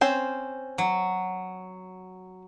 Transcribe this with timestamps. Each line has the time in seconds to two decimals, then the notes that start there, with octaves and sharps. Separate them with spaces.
0.01 C4 C#4 C5
0.78 F#3